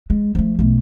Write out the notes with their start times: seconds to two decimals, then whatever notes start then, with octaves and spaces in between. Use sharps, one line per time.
0.10 G#3
0.35 F3 A3
0.59 B1 A3